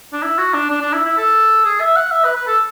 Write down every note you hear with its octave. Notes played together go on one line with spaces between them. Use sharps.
D4
E4
F#4
D4
D4
D4
E4
E4
A4
G#4
E5
F#5
E5
B4
B4
A4